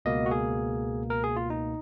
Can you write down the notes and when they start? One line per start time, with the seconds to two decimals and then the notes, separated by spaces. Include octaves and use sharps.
0.05 C#2 B2 A#3 D#5
0.26 F#4
0.31 G#4
1.10 A#4
1.24 G#4
1.36 F4
1.50 D#4